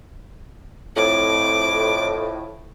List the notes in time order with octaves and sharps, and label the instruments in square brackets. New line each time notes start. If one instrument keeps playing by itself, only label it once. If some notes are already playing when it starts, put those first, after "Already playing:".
[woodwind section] F2 A2 [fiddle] D6